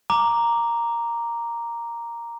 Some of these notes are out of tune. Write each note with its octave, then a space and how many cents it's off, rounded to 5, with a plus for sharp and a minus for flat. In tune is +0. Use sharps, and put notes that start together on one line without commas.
A#5 +0 D6 +0